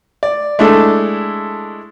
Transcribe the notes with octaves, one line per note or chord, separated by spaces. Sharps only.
D5
G#3 A3 D4 E4 A4